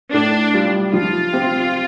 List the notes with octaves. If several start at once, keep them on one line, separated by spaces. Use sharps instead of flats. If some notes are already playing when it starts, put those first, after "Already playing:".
A2 D4
G3 F4
F3 F4
C4 G4